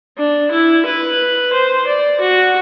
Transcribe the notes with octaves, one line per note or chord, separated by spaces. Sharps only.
D4
E4
B4
C5
D5
F#4